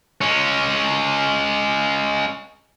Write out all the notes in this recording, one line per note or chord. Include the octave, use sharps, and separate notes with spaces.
G#3 C#4